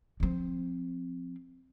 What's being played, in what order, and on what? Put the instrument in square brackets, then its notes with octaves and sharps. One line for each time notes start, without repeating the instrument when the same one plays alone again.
[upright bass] F3 C4